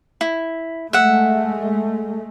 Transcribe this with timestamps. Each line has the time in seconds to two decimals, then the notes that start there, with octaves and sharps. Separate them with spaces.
0.21 E4
0.93 G#3 A3 E5 F#5